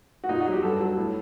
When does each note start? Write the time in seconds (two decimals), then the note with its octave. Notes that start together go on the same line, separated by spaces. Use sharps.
0.24 F#4
0.29 A#2 D#4
0.40 F#4
0.46 F#3
0.52 G4
0.63 G2 A4
0.80 F#3
0.97 A2